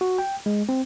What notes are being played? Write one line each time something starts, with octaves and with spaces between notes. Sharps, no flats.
F#4
G5
G#3
C4